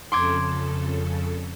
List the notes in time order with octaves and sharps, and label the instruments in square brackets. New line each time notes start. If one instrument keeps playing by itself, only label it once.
[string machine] F2 C#3 A4 [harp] C6 D6 G#6